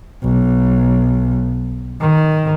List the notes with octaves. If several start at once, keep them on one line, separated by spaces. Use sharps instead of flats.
B1
D#3